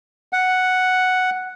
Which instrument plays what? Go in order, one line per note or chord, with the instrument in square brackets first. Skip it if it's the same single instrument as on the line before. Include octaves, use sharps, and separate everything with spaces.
[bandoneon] F#5